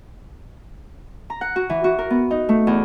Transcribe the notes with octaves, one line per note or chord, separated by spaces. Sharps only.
A#5
F#5
F#4
E3
F#4
A#4
B3
D#4
A3
E2